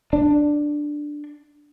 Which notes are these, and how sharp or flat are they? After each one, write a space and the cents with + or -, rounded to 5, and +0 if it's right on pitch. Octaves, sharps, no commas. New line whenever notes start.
D4 +5